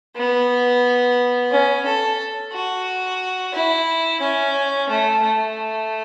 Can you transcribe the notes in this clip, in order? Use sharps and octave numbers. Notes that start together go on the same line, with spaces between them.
B3
C#4
A4
F#4
E4
C#4
A3
A3